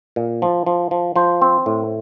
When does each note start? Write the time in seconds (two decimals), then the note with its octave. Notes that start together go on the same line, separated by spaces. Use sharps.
0.16 A#2
0.42 F3
0.66 F3
0.91 F3
1.16 F3 C5
1.42 C4
1.66 A2